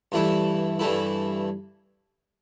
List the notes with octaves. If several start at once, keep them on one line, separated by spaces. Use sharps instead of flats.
G2 E3 A3 E4
G2 E3 A3 E4